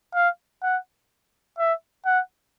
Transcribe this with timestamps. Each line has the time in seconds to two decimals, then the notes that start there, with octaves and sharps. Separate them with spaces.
0.14 F5
0.63 F#5
1.59 E5
2.05 F#5